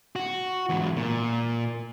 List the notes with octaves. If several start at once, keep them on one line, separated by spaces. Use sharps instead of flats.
F#4
E2 G#2
A#2